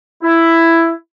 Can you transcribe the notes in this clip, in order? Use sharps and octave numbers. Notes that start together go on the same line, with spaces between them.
E4